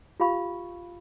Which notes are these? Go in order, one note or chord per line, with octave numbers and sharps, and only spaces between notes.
F4 G4 F5 B5 C#6